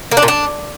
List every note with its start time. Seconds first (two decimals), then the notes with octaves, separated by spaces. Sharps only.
0.11 A#3
0.17 D4
0.22 A#2
0.28 D4